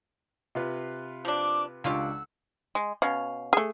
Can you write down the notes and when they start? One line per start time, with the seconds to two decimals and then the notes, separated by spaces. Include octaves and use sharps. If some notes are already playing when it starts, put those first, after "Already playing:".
0.55 C3 F4 B4
1.25 F3 D4 D6
1.84 C#2 A#3 D4 F4 G4 F#5 C#6 E6
2.75 G#3
3.02 B2 C#4 F5
3.53 A3 G#4